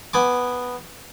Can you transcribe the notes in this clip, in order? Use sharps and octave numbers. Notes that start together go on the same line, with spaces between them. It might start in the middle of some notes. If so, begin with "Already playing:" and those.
B3 G#5 D6